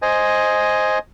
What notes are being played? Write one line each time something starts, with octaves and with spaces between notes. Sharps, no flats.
C5 D#5 G#5